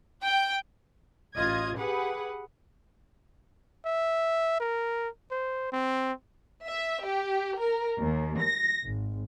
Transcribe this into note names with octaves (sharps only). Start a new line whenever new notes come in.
G5
A1 F4 D#5 G#6
G4 G#4 B4 F#5
E5
A#4
C5
C4
E5
G4
A#4
D#2
A#6
G#1